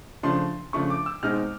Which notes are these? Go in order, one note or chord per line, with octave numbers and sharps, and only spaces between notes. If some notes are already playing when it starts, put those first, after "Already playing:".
C#3 F3 A3 D4 C6
C#3 F3 A3 D4 C#6
D6
E6
B2 G#3 C4 D#4 F6